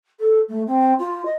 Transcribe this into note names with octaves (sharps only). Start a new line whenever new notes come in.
A4
A3
C4
F4
D#5